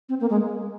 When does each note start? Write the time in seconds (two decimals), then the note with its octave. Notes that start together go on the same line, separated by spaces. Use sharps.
0.09 C4
0.21 A#3
0.30 G#3